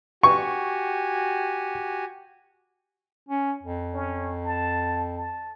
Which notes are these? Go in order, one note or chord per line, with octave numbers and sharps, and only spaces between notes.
F#4 G4 G#5 C#6
C#4
F2
C#4
A5
A5